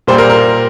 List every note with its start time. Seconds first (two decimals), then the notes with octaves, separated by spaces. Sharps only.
0.07 A#2 G3 A#3 C5
0.18 A#4
0.30 A#4